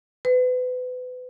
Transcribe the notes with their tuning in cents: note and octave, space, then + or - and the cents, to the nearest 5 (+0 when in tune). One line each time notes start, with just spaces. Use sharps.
B4 +30